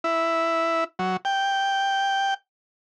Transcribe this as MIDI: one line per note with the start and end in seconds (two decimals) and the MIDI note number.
0.04 0.84 64
0.99 1.17 54
1.25 2.34 79